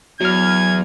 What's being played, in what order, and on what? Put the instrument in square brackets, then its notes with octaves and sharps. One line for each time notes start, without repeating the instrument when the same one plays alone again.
[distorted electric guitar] E2 [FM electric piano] F#3 F6 [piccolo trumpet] G#6